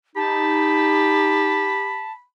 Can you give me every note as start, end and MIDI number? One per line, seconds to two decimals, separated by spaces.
0.16 1.81 63
0.16 2.05 67
0.16 2.12 81
0.16 2.24 83